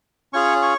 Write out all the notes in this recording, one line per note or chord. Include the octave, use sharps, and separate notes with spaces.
C#4 F4 G#4 C#5 C#6
C#5 C#6